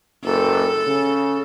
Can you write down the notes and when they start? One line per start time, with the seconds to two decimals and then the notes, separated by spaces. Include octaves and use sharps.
0.24 F#1 A4
0.87 C#3